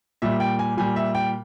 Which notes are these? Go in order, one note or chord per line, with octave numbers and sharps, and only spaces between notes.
A#2 G3 E5
G5
G#5
A#2 G3 G#5
E5
G5